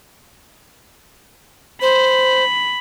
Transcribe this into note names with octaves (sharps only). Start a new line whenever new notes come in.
C5 B5